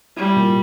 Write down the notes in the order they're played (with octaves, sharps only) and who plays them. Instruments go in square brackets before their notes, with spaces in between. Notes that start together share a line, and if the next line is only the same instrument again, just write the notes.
[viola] G3 [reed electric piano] E4
[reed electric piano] A#2